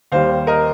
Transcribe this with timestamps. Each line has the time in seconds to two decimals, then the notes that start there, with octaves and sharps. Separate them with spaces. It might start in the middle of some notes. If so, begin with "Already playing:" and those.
0.12 D#2 D#3 G3 C5 F5
0.47 A#4 D#5